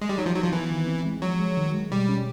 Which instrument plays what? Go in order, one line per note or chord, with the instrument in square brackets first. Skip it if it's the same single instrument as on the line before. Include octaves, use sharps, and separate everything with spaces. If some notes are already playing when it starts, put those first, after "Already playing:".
[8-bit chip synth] G#3
G3
[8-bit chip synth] F#3 [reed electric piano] D#4
[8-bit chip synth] F3
[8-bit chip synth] F#3 [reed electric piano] D#4
[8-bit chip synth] F3
[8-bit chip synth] E3 [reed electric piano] B3
[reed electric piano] D#3
C4
G#3
[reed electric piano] F3 [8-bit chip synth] F#3
[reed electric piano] G#3
D#3
G#3
[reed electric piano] B2 [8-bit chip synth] G3
[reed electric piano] C#4